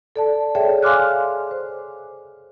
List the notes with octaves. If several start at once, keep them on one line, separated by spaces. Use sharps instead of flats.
A4 D5 A5
G#4 A4 C#5 D5 E5 G5
F5 G#5 C6 D6 F6 F#6
C5